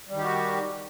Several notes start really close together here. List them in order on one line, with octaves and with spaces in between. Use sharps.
G3 D#3 G4 F#4